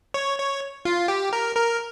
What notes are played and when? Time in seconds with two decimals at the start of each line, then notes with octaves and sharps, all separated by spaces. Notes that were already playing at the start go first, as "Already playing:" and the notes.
0.14 C#5
0.38 C#5
0.85 F4
1.08 G4
1.33 A#4
1.56 A#4